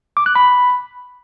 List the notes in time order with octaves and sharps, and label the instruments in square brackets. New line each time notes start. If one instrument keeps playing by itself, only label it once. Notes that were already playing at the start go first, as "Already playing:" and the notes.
[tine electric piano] D6
F#6
B5